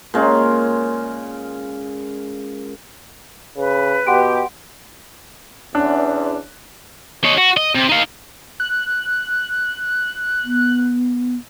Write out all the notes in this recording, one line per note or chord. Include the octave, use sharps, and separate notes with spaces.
A#2 G#3 C#4
C#3 B4
B2 G4 F#5 C6 D7
E2 C#4 D4 F#6
D#4 C#5
F#4
D#5
C3
D#4 F5
F#6
B3